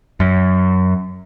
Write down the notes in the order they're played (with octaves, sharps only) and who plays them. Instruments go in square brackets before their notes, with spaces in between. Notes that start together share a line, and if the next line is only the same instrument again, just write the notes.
[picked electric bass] F#2